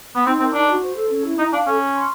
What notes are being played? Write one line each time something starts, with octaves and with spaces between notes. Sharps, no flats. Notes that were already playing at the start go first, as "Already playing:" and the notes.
B3
C4 D#4
C4 A#4
D4 D#4
F#4
C5
A4
C#4
E4
D#4 A#5
D4 F5
C#4 A4
C#5
C6